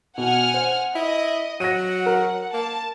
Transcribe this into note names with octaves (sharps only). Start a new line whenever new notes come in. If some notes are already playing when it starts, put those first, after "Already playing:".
B2 F#5 G#5 F6
C5
E4 D#5
F#3 F#5 A#6 D#7
A#4
A#3 A5